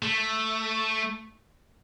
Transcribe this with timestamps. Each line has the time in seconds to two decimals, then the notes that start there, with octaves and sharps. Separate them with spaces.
0.03 A3